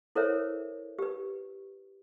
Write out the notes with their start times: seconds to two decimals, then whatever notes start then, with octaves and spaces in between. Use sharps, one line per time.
0.15 E4 A4 A#4 C5 C#5 E5
0.99 G4 B4